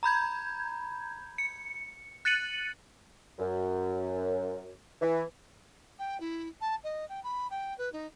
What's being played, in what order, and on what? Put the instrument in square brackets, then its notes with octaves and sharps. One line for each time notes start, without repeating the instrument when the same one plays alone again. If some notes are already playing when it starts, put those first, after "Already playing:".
[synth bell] A#5 B5 G6 G#6
C#7
F#6 A6 C#7 D#7 F#7
[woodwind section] F#2
E3
[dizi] G5
E4
A5
D#5
G5
B5
G5
B4
D#4